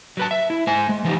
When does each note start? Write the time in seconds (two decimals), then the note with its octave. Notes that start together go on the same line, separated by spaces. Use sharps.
0.17 F#3 B4 A5
0.31 E5
0.50 E4
0.67 G#3 C5 G#5
0.89 G#3
1.04 E3 F3 D#4 G4